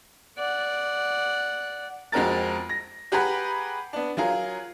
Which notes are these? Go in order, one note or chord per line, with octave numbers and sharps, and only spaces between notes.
D5 F#5
F2 G#3 C4 F#4 A#4 A6
A#6
G4 G#4 B4 F#5 A#5 B5
B3 D4
F#3 F4 G#4 A#4